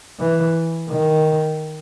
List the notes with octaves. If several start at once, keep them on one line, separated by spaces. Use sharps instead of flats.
E3
D#3